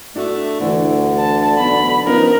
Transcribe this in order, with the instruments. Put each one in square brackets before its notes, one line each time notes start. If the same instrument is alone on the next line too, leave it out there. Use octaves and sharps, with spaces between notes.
[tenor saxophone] A3 [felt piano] D4 F#4
[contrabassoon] D2 [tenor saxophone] D3 [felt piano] E3
[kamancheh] A5
[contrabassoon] B1 [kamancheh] B5
[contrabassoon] F3 [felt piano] B3 C#4 D#4 [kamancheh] A#4